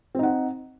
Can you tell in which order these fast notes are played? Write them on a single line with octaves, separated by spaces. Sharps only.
C4 D#4 F#5